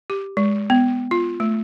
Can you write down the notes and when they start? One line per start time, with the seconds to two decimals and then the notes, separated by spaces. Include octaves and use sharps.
0.10 G4
0.37 G#3
0.70 B3
1.11 F4
1.40 A3